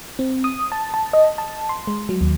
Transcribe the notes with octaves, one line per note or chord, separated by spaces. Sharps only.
C4
D#6
A5
A5
D#5
A5
C6
G#3
F#3
D#2